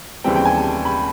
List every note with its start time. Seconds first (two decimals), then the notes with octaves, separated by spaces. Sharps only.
0.24 D#2 C#3 E3 G3 C4 G5
0.36 G5
0.45 G#5
0.55 A5
0.85 B5